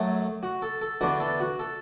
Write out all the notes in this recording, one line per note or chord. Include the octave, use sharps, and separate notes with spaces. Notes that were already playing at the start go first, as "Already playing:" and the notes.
Already playing: F#2 F#3 A3
F#4
A4
A4
E2 D3 B3 D4 F#4
A4
F#4
A4